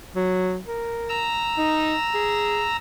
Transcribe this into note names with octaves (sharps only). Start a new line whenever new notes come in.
F#3
A#4
A#5 E6
D#4
G#4